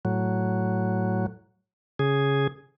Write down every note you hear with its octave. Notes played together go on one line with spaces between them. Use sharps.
A2 F#3
C#3 G#4